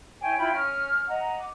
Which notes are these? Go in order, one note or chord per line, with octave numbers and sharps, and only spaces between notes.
E4 C#5 G5 G#5
E4 F4 G5 B5
C#4 F6
D#5 F#5 A#5
D6